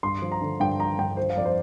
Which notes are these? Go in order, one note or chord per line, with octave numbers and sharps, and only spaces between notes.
G2 C6
F3
A#5
D3
G2 G5
F3 A#5
G2 G5
F3 C5
F5
F2 D5
C5